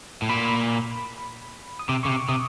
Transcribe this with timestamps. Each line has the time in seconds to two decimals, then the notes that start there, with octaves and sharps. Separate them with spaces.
0.22 A2
0.29 A#2 B5
1.79 D#6
1.89 C3 D6
2.03 C#3 C#6
2.08 C3
2.16 D6
2.29 C3 D#6